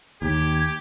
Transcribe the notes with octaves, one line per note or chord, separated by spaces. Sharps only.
D#2 G4 G#6